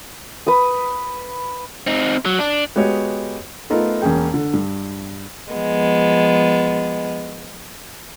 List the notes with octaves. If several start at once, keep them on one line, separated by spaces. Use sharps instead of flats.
B4 D#6
C4 D#4
F#3
D4
G#3 B3 F#4 G4 C#5 D#5
A3 B3 D#4 F4 A#4
E1 A#3 C#4 G#4 G5
D3
G2
F3 G#3 B3